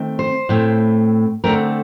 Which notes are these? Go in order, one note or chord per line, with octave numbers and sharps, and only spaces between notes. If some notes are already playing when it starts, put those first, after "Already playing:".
Already playing: D#3 A3 C4
C5
A2 A3 C4
D3 A3 C4 A#4